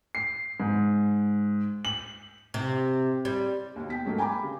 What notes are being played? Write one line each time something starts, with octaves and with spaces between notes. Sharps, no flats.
C7
G#2
F#7
C3
G3
D#2 B2
G5 B6
G#2 F#3 A3 A#3
G5 G#5 A#5 B5 D6
C#3